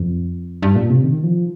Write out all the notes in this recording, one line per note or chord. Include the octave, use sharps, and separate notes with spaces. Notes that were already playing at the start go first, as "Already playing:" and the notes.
Already playing: F2
G2
A#2
C3
D#3
F3